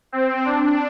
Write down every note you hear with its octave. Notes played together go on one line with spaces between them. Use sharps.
C4
D4